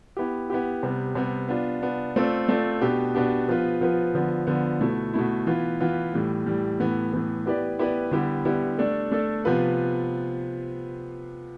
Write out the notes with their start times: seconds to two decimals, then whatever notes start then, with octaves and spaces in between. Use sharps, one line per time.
0.17 B3 E4 G4
0.50 B3 E4 G4
0.83 C3 G3 B3
1.15 C3 G3 B3
1.49 B3 D4 F4
1.82 B3 D4 F4
2.16 A3 C4 F4 A4 D5
2.49 A3 C4 F4 A4 D5
2.81 B2 B3 D4 G4
3.15 B2 B3 D4 G4
3.49 F3 B3 F4 B4
3.81 F3 B3 F4 B4
4.14 D3 F3 B3
4.47 D3 F3 B3
4.80 B2 A3 E4
5.14 B2 A3 E4
5.47 E3 B3 F4
5.81 E3 B3 F4
6.13 A2 E3 G3
6.46 A2 E3 G3
6.80 A2 E3 B3
7.13 A2 E3 B3
7.46 B3 E4 G4 B4 D5
7.79 B3 E4 G4 B4 D5
8.11 D3 G3 B3 E4 G4
8.45 D3 G3 B3 E4 G4
8.78 A3 D4 A4 D5
9.11 A3 D4 A4 D5
9.45 C3 F3 B3 F4 B4